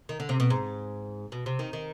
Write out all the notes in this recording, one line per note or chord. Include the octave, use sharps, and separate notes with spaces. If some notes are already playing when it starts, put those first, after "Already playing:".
D#3
D3
C3
B2
G#2
B2
C3
D#3
D#3